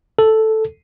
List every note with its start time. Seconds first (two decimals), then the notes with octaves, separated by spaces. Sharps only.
0.19 A4